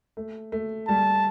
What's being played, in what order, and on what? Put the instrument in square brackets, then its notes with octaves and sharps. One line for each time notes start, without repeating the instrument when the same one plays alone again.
[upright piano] A3
A3
[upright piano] G3 [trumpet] A5